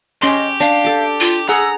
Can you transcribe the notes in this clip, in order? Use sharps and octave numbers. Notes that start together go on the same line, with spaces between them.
C#4 G4 D#5 C6
D4 F5
A4 D6
F4
G#4 F#5 A#5 E6